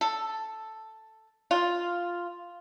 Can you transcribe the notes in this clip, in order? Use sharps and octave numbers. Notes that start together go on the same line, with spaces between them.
A4
F4